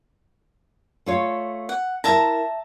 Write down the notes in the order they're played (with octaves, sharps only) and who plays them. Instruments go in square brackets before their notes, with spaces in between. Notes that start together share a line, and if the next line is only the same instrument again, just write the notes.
[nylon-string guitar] A3 F4 C#5
[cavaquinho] F#5
[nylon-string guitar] E4 A#4 [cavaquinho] E5 A5 A#5